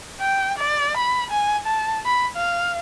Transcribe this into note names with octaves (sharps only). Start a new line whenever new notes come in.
G5
D5
B5
G#5
A5
B5
F5